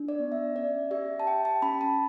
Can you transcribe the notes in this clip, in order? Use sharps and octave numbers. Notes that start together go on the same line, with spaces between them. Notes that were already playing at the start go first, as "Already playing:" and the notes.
Already playing: D4
D5
B3
E5
C#4 D5
G4 E5
A5
G4 G5
A5
C#4 B5
A5